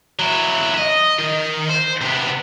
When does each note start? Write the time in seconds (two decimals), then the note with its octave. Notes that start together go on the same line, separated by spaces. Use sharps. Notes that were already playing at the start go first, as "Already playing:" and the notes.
0.19 F#3 E4
0.74 D#5 E5
1.19 D#3
1.69 C5
2.01 C3 B3